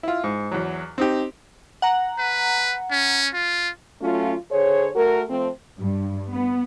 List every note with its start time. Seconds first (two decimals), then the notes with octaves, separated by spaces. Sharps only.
0.03 E4 F4
0.24 G#2
0.52 E2 F#3
0.98 C4 D#4 G4
1.82 F#5 A#5
2.19 B4
2.91 C#4
3.34 F4
4.02 F#3 A3 C#4 F4
4.51 D3 G#4 C5 C#5
4.96 A3 F#4 A#4
5.30 F3 A3 C4
5.79 G2
6.32 B3